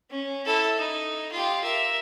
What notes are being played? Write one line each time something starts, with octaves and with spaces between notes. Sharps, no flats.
C#4
E4 A4
D#4
F4 G4
A#4 E5